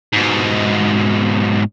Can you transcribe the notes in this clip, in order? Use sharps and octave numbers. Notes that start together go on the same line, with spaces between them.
G#2 B2